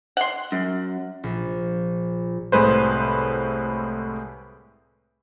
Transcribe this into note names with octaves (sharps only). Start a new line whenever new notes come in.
F#5 C6
F#2
A#1
C2 A2 G#3 B4 C5